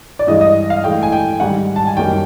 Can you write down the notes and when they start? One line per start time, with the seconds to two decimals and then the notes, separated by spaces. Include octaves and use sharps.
0.19 D5
0.27 G2 E3 G#3 D#5
0.41 D#5
0.70 F5
0.84 A2 E3 G#3 G5
1.03 G#5
1.13 G5
1.40 G#2 D#3 G3 F#5
1.76 A5
1.87 G#5
1.97 F#2 D#3 G3 A#3 G5